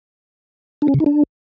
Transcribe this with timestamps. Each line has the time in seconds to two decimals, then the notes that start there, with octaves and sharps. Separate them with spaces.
0.82 D4
0.88 C#4
0.94 C#3
1.00 D#4
1.06 D4